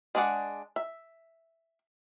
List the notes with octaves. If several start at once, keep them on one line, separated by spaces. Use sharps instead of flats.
G#3 D4 G#4 D5 F#5
E5